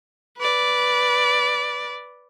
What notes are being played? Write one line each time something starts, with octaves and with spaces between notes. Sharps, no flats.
B4 D5